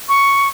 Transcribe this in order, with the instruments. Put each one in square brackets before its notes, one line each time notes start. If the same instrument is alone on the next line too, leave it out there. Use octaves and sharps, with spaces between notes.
[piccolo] C#6